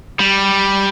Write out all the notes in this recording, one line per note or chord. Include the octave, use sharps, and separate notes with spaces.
G3